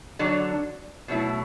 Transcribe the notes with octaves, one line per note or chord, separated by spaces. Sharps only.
D3 F#3 D4
B2 F#3 A3 E4